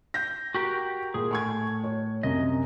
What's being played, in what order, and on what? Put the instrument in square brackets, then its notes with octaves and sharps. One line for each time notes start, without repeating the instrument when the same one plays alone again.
[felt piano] G6 A#6
[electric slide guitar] F#4 G4 A#4
[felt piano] A#2 [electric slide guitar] G#4
[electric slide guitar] A2 [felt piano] G#5 C#6 G#6
[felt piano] C#5
[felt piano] C2 F#2 [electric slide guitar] D#5